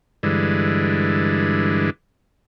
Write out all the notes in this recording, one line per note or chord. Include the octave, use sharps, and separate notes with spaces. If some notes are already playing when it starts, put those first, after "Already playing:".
G2 D3 E3 G#3